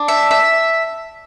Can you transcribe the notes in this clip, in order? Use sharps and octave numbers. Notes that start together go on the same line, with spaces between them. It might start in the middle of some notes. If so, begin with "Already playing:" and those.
Already playing: D4
E5
E5